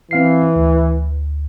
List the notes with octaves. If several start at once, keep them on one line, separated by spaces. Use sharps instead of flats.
E3 C4 F5 C7
D2